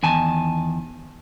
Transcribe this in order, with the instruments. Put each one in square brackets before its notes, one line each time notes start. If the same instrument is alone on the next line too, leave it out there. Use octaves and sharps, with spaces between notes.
[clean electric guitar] E2 D#3 G#5 A5